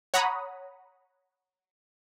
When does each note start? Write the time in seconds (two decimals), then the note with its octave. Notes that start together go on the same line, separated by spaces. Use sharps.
0.14 C#5 F#5 A#5 B5 D#6